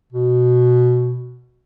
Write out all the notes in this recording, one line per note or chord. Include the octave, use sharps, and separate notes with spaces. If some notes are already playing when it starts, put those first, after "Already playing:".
B2